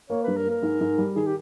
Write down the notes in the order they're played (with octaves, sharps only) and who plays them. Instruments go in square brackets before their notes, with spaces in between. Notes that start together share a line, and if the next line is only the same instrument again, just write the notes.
[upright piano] A#3 [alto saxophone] C#5
[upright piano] G2 [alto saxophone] B4
[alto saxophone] A#4
[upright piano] A#3
[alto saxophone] A#4
[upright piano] G#2
G#2
G3
[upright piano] D#3 [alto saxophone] G#4
[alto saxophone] G4